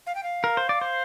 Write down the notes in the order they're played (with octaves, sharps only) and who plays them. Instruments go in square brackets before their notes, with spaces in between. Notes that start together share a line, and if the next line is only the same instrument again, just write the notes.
[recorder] F5
G5
F5
[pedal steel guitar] A#4
C5
D5
C5